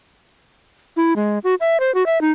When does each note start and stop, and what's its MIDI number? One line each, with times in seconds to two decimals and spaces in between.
0.97 1.13 64
1.16 1.39 56
1.44 1.54 66
1.61 1.80 76
1.80 1.93 72
1.95 2.05 66
2.06 2.20 76
2.21 2.32 63